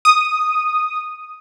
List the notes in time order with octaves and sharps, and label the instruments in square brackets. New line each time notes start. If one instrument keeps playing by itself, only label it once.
[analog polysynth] D#6